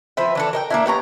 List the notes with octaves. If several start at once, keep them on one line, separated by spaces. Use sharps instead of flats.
F3 C4 B4 E5
E3 D4 A4
A#4 D#5 G5
A#3 D4 E4
B3 G4 C#5 A#5